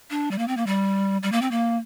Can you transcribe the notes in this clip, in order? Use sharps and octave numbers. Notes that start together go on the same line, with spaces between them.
D4
G3
A#3
C4
A#3
G3
G3
A#3
C4
A#3